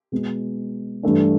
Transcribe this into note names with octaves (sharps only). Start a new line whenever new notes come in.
B2 G#3 B3
G2 E3 A3 D4